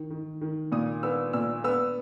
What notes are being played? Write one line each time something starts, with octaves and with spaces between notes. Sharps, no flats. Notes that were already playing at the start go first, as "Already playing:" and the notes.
Already playing: D#3
D#3
D#3
A#2 D#6
B3 E6
A#2 E6
B3 E6